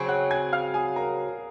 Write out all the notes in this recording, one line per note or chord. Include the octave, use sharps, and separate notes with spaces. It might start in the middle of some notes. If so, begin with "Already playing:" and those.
Already playing: C#3 F#3 C4 G#5
F#5 F#6
G#5 G#6
F5 F6
G#4 G#5
A#4 A#5